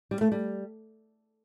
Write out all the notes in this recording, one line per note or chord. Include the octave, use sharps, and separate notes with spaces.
G3
A3
G3